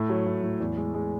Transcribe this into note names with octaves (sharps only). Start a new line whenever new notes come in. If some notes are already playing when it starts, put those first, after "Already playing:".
Already playing: A2 A3
F#3
A2
A2
E2
G#3
G#3